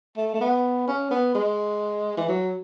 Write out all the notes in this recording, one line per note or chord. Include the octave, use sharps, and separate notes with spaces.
A3
A3
B3
C#4
B3
G#3
E3
F#3